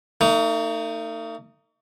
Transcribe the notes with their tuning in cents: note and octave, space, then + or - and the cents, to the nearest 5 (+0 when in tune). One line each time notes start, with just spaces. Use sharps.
A3 +45 D#4 +0